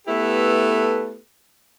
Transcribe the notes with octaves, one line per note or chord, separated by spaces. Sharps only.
A3 B3 E4 G4 A4 B4